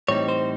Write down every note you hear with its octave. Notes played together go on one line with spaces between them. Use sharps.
A2 E3 G3 C4 D#4 C#5
C5